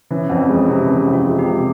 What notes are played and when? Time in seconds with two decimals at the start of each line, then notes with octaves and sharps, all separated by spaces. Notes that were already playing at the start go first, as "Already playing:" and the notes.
0.11 E3 C#4
0.30 F2 C#4
0.49 G#3 C#4
0.68 C3 E4
0.87 E3 C#4
1.06 F2
1.13 F4
1.26 G#3
1.39 G4
1.45 C3